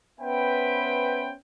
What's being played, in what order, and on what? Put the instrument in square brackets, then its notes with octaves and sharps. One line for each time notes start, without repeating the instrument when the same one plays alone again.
[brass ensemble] B3 C#4 B4 C5 E5 G5